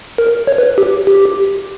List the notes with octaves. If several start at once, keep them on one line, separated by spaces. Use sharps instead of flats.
A#4
C#5
B4
G4
G4